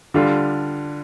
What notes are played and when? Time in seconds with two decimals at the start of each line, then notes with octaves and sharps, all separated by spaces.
0.14 D3 G3 D4 F4